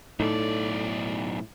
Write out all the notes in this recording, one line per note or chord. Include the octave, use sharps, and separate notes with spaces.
B1 A2 D#4 A4 D5